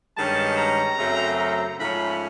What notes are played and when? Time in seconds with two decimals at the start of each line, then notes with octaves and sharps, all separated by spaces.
0.17 G2 D#3 G#3 C#4 A5
0.58 A#5
0.99 F#2 C#3 F#3 A3 C4
1.39 A#5
1.80 G#2 F3 A3 C#4 B5